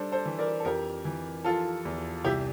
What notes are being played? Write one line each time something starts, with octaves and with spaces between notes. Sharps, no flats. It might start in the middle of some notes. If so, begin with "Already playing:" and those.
Already playing: G3 D4 A4 C5
A4 C5
E3
A#4 D5
A4
F2 G4 A#4
E3
F3 F4 A4
E2
C2 E4 G4